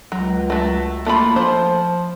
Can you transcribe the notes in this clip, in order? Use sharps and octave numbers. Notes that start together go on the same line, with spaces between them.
C#2 F#3
F#3 A3
A3 A#3 F4 B5
F3 C5